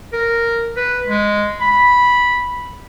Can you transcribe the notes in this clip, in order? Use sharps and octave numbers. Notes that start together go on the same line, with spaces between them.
A#4
B4
G#3
B5